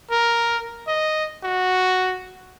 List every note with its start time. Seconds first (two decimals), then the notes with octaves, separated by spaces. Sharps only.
0.11 A#4
0.87 D#5
1.44 F#4